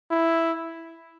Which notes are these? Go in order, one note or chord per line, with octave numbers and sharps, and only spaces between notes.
E4